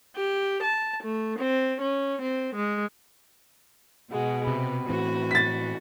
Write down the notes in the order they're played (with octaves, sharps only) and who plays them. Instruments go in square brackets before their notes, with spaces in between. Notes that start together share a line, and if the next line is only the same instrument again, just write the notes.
[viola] G4
A5
A3
C4
C#4
C4
G#3
[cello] B2 [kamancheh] G#3 F#4
[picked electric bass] C3 [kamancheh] B4
[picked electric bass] A2 E3 C4 [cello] F#4
[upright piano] A6 B6